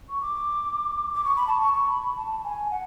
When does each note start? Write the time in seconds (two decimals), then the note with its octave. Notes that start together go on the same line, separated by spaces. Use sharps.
0.09 C#6
0.22 D6
1.13 D6
1.24 C#6
1.36 B5
1.47 A5
1.60 C#6
1.74 C#6
1.89 B5
2.16 A5
2.44 G#5
2.71 F#5